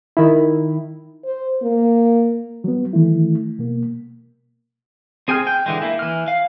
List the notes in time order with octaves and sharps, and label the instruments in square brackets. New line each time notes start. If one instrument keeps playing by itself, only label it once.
[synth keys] D#3 E4
[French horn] C5
A#3
[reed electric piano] F#3 B3
D#3 E3 A3 E4
B2 A#3
[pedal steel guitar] C4 G#4 G5 G#5 F6
G5
D3 E3 G#3
A#3 E4
E3 F6
F5